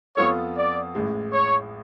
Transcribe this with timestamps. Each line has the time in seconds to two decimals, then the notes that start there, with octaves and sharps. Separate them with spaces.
0.17 F2 F3 B3 F4 A4 C#5
0.56 D5
0.95 A1 A2 G#3
1.33 C#5